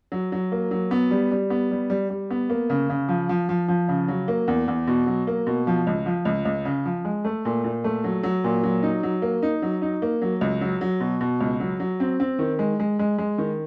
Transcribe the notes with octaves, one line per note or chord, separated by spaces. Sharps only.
F#3
F#3
A#3
F#3
B3
G3
G3
B3
G3
G3
G3
B3
A#3
C#3
C#3
F3
F3
F3
F3
C#3
F#3
A#3
E2
E2
B2
F#3
A#3
B2
F3
C#2
F3
C#2
C#2
C#3
F3
G#3
A3
A#2
A#2
A3
F#3
F#3
A#2
F#3
D#4
F#3
A#3
D#4
F#3
D#4
A#3
F#3
C#2
F#3
F#3
B2
B2
C#2
F#3
F#3
C4
C4
D#3
G#3
G#3
G#3
G#3
D#3